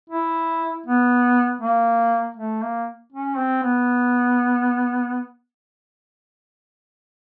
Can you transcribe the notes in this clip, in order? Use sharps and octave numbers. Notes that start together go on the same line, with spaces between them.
E4
B3
A#3
A3
A#3
C#4
C4
B3